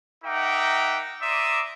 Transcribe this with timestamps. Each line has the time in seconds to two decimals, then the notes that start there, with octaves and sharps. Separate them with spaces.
0.24 D#4 A#4 E5 F#5 G5 D6
1.22 D5 E5 A#5 C6 D6 D#6